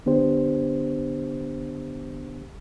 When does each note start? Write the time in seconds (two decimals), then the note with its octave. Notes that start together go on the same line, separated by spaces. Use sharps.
0.06 D3 B3 D4 G4 C5